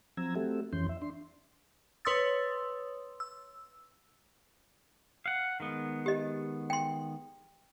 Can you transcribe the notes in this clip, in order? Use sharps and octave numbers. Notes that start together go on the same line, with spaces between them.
F3 F#3 C4 A#5 E6 G#6
A3 C4 F#4 G4 A4 E5
F2 E3 C#4 C6 G6
E5
D4 C6
B4 C#5 C6 D#6 E6 A6
E6
F5 F#5
D#3 G#3 B3
G4 D#5
G5 C6